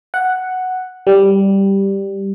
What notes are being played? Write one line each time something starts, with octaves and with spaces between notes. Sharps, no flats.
F#5
G3